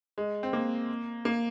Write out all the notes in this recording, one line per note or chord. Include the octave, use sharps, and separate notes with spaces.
G#3
C4
A#3
A#3